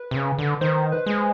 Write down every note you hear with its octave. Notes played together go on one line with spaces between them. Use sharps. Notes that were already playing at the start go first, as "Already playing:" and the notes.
Already playing: B4
C3
C#3
D3
D#3 C5
B4
G#3